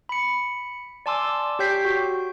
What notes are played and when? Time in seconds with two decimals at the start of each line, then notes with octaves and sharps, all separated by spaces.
0.09 B5 C#7
1.06 D5 G#5 A5 C6 D6 E6
1.59 G4 C#5 G5 G6 B6 C7
1.85 F#4